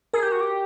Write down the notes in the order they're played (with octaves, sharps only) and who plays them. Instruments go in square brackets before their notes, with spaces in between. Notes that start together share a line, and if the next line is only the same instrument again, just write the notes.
[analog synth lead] G#4 [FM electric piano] A#4
[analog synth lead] G4
F#4
G4